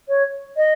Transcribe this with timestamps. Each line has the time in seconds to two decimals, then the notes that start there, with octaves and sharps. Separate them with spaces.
0.08 C#5
0.56 D#5